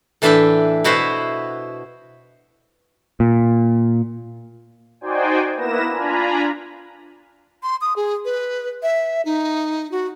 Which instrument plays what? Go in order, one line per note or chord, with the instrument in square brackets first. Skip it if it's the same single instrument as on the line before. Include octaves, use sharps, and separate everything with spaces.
[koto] A2 E3 D4 B4 E5 G5
B2 E4 F#4 B4 C5
[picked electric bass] A#2
[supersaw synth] D#4 F#4 C5 D5 G5 G#5
A#3 B3 E4 B4 A#6 E7
D4 F4 G#5 A#5 B5
[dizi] C6
D#6
G#4
B4
E5
D#4
F#4